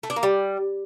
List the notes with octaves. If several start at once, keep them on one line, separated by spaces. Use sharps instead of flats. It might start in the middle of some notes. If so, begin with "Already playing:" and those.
A3
D4
A#3
G3